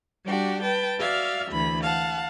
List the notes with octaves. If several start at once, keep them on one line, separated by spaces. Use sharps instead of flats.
G3 D4 F#4 G4
B4 G5 A5
F#4 D5 E5 F5 F6
D2 E3 B5
F5 F#5 A5